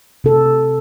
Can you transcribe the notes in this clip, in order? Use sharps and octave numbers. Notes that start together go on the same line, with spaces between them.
C3 A4